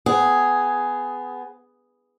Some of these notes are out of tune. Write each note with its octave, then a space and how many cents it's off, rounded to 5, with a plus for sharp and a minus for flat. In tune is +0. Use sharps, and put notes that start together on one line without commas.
B3 +20 G#4 +5